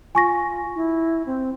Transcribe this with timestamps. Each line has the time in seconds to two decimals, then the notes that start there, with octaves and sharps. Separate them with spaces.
0.15 F4 G#5 C#6 A#6
0.76 E4
1.26 C4